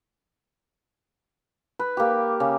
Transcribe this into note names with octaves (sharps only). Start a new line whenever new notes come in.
B4
A#3 G4
C#3